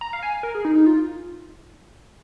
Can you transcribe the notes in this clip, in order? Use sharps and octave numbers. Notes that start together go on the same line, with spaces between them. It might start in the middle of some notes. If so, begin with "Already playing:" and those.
A#5
F5
G#5
A#4
G#4
D#4
D#4
F4